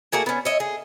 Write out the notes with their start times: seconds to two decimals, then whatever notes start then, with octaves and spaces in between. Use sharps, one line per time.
0.12 A3 A#3 F#4 G#4
0.26 B3 C#4
0.45 C#5 D#5 E5
0.60 G#4